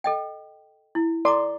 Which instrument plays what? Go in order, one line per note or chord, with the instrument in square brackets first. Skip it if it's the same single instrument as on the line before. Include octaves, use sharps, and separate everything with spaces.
[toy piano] A4 D#5 G5
E4
[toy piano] A4 A#5 D6 [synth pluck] D5 C6